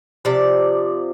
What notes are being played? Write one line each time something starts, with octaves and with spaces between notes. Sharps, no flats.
C3 F3 D5